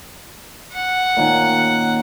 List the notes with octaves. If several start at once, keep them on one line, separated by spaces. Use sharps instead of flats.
F#5
A#2 D#3 C#4